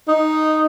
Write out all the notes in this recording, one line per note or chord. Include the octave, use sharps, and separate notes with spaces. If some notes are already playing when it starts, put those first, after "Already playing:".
D#4